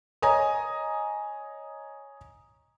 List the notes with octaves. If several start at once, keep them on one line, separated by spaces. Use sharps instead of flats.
C#5 D#5 G#5 A#5 D#6